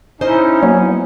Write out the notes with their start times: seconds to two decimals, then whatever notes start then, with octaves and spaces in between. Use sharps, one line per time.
0.21 C#4 D#4 E4 C5 D#5
0.63 F#3 A#3 B3